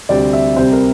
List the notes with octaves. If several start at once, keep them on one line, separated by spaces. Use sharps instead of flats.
D2 C3 G3 C4 D5
E5
C2 C3 G3 C4 C5
A#4